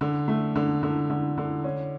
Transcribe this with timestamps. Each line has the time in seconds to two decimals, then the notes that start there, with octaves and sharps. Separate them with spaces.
0.01 D3
0.28 A3
0.56 D3
0.83 D3
1.10 D3
1.38 D3
1.64 C#4